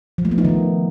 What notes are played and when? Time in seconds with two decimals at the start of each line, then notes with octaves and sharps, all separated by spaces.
0.18 F3
0.25 A3
0.31 B3
0.38 D#4
0.45 D#3